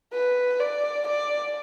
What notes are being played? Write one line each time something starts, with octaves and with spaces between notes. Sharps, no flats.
B4
D5
D5